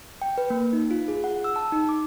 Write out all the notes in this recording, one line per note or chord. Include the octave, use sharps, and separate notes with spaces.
G5
B4
A#3
D#4
F4
G#4
F#5
E6
A5
D#4
D6